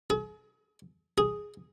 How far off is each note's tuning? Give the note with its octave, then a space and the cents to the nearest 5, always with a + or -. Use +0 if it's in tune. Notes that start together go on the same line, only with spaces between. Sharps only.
G#4 +40
G#4 +0